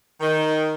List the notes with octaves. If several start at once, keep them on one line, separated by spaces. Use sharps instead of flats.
D#3